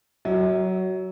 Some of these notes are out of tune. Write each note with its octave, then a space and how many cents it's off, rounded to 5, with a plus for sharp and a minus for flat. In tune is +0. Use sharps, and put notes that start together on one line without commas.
F#3 +15 E5 -45